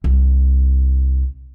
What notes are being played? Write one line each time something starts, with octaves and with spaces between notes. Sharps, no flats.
C2